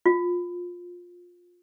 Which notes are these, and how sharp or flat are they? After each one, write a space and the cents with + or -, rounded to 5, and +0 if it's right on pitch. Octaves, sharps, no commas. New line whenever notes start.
F4 +20